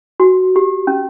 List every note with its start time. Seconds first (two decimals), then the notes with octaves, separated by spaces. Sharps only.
0.20 F#4
0.56 G4
0.87 C#4